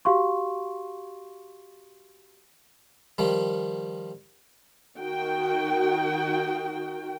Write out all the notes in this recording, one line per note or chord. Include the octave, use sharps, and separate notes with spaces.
F#4 G4 F5 C6 C#6
D#3 F3 G3
D#3 F#4 G5